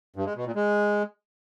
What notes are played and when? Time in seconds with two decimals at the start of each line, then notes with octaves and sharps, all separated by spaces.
0.16 G2
0.26 G#3
0.36 B2
0.45 A#2
0.55 G#3